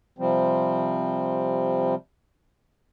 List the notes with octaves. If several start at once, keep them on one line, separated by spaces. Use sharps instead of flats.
C3 F3 G3 C4